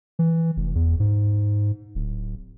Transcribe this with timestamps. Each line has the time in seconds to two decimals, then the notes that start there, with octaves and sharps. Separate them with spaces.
0.19 E3
0.57 F1
0.75 E2
1.00 G#2
1.95 D1